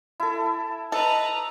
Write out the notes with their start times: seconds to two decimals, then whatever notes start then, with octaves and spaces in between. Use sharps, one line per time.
0.20 E4 A4
0.92 A4 B4 D#5 A#5